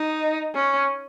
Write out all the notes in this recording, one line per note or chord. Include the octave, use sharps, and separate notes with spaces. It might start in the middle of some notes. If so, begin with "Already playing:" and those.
Already playing: D#4
C#4